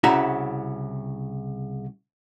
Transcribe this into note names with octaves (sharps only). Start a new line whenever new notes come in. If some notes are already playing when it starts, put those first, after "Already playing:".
C2 C#3 E4 F#4 E5 A#5